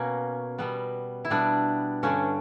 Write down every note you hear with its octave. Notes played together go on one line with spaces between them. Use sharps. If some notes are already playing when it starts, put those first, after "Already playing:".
Already playing: B2 A#3 C#4
B2 G3 B3
E4
B2 G3 B3 D4
G2 D3 G3 C#4